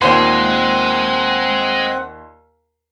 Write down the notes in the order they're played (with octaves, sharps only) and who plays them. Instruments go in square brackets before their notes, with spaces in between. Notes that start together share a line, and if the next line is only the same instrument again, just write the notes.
[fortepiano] D#2 A#2 C5 [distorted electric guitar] G#3 [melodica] C4 F#5